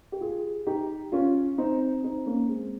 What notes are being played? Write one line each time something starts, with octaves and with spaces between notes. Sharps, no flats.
G4
F4 G#4
D#4 G4
C#4 F4
C4 D#4
C4 D#4
A#3 C#4
G#3 C4